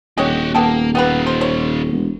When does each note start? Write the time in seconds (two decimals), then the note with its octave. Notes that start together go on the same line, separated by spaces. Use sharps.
0.18 D#1 G#3 F#4 G4 C#5 G5
0.55 A#3 B3 G4 A4
0.95 B3 D#4 F4 G4 B4
1.27 C5
1.41 C5 C#5
1.92 E1